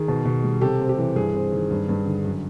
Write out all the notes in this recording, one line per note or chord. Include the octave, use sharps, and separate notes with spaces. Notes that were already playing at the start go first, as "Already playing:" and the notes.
Already playing: D#3 G#4
B2
B2
G3
C3 G4 A4
C4
G4
E3
G2 G#4
C4
D#3
G2
G2
D3
F#2